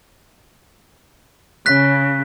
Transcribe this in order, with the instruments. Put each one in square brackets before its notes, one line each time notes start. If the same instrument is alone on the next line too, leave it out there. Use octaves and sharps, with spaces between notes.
[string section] C#3 [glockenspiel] F#6 B6